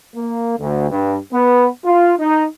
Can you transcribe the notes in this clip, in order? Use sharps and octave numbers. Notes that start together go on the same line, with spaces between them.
A#3
D2
G2
B3
F4
D#4